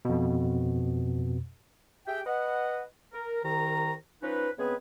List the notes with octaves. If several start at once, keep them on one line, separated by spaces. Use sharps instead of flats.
F2 B2
G4 G#4 E5 G5
B4 D#5 F#5
A#4
C2 D#3 A#5
F3 C#4 D#4 B4
C#3 G#3 B3 C4 G#4 B4